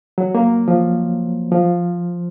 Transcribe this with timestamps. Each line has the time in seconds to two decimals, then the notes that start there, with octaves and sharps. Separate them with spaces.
0.18 F#3
0.35 A#3
0.68 F3
1.51 F3